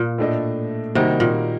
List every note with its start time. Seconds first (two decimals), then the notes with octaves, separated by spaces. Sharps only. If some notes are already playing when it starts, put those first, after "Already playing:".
Already playing: A#2
0.18 A2 A3 D4 A4 D#5
0.95 C3 D#3 G3 A#3 D#4 F#4
1.20 A#2